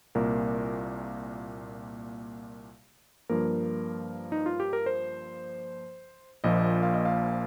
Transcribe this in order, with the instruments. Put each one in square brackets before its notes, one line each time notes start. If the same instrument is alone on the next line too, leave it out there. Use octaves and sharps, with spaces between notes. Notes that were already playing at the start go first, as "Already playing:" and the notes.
[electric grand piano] C2 A#2 A#3 A#4
G2 F3 A#3 A#4
D#4
F4
G4
A#4
C5
A#1 A#2 F3 A#3 D#5
F5
D#5
F5